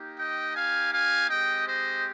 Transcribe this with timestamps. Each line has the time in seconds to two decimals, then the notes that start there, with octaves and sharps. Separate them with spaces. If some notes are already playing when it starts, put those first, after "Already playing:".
Already playing: A#3 D#4 G4
0.19 D#5 G5
0.56 F5 G#5
0.93 F5 G#5
1.30 G#3 C4 G4 D#5 G5
1.67 C5 D#5